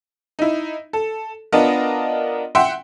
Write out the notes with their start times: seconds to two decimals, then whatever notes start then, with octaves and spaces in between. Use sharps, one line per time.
0.39 D#4 E4
0.93 A4
1.52 B3 D4 F4 A#4 D#5
2.55 E5 F#5 G5 C6